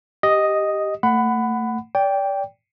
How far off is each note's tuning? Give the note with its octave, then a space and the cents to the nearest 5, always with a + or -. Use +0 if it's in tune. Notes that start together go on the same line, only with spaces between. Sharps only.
G4 +0 D#5 +0
A3 +30 F#5 +0 B5 +20
D5 -30 G5 +5